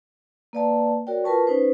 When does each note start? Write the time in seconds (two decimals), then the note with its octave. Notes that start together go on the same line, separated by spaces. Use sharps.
0.53 A#3 B4 D5 F5 A5
1.07 F#4 A#4 C#5 D5 G5
1.24 F4 A#4 B4 A5 C#6
1.47 C#4 D#4 B4 C5